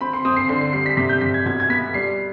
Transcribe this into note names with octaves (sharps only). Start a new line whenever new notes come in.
C4 B5
C6
C4 D#6
C7
D3 C7
C7
G3 C7
B6
C3 B6
G6
C3 B6
G#6
B2 G#6
G#6
B3 B6
G3 C7